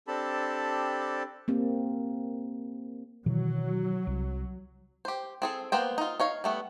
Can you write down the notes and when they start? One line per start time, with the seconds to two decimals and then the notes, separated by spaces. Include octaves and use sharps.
0.07 C4 D4 G4 A4 A5 B5
1.48 A#3 C4 G4
3.26 B2 D#3 E3 F#3
4.07 C2
5.05 G4 C5
5.42 C4 G#4 A4
5.72 A#3 B3 C5 G5
5.98 D#4 F4
6.20 D#4 C#5 F5
6.44 G3 A3 B3